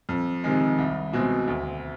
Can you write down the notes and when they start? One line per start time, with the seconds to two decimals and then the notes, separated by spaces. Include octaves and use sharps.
0.09 F2
0.44 C3 D#3 G#3
0.78 C2
1.13 B2 G#3 C4
1.48 D2